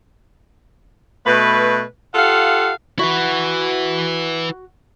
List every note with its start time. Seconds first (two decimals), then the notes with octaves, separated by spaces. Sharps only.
1.25 B2 A3 B4
2.15 F4 G4 A4 F5 F#5
2.99 E4 F#4 B4